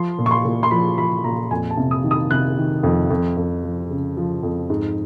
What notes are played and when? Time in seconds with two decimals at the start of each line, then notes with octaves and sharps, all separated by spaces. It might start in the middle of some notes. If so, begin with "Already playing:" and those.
Already playing: F3 C6
0.19 A#2
0.26 C#6
0.31 C6
0.45 A#2
0.63 C6
0.71 F3 B5
0.98 F3 B5
1.24 A#2 A#5
1.51 F2 G#5
1.71 A5
1.77 C3
1.91 D#6
2.04 D#3
2.11 D#6
2.31 C3 F#6
2.57 D#3
2.83 F2
3.10 F2
3.37 F2
3.64 F3
3.90 C#3
4.17 F3
4.43 F2
4.70 G#2